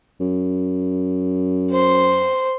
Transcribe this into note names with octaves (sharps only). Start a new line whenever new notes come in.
F#2
C5 C6